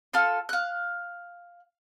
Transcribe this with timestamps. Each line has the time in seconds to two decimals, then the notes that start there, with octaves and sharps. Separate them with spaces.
0.13 F4 A4 A5 C6
0.49 F5 F#6